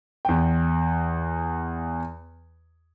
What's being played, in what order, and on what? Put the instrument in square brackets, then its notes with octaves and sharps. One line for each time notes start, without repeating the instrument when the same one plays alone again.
[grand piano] E2 G5